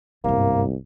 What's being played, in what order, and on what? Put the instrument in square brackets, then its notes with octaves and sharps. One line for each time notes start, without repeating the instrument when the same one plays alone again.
[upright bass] G1 G#2 [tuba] C2 [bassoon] A#3